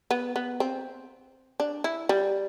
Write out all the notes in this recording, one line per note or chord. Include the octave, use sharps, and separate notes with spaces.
B3
B3
C4
D4
E4
G3